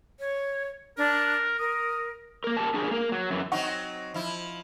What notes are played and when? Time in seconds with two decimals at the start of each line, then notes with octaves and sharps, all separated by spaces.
0.20 C#5
0.98 D4 A#4
1.59 A#4 D#6
2.44 A#3 A#4
2.57 G4 A#4 A5
2.74 D4 G#4 A#4
2.91 A#3 A#4
3.12 F#3
3.30 F#2 E3
3.52 F#3 C4 D#4 F#5 C#6
4.14 F3 E4